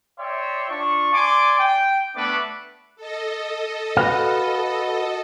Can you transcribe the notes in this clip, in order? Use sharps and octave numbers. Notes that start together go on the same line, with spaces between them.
C#5 D5 E5 G5 C6
D4 F4 C#6
D5 G#5 C6 D6
G5
A3 B3 D4 B4 D6
A4 D#5
F#4 B4 F5